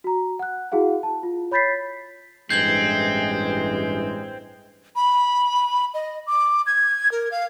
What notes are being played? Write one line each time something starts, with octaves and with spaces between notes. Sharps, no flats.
F#4 A#5
F#5 F#6
E4 F#4 G#4 F5 F#5
A5
F4
C#5 B5 G6 A6 B6 C7
A1 G2 E3 G#3 C4 G6 G#6 F#7
B5
D#5
D6
G#6
A#4
F5